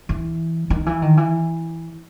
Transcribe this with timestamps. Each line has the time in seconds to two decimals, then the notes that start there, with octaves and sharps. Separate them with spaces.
0.09 E3
0.70 D#3
0.86 E3
1.02 D#3
1.17 E3